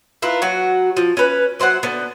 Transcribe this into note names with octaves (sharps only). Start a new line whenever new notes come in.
E4 F4 A#4 B4
F#3 F#4
F3
C#4 B4
F#3 C5 D5 F#5
D3 B3